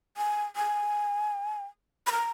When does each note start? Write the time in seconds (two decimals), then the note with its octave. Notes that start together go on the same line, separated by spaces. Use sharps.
0.17 G#5
0.56 G#5
2.07 B5
2.12 A#5